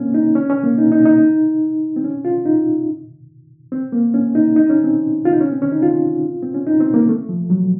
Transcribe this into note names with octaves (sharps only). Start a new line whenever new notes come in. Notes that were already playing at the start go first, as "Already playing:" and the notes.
Already playing: A#3 C4 C#4
D#4
C#4
C#4
A#3
D#4
D#4
D#4
C4
C#4
F4
D#4
C4
A#3
C#4
D#4
D#4
C#4
C4
F4
D#4
C#4
C4
C#4
D#4
F4
C4
C#4
D#4
C4
A#3
A3
F3
F#3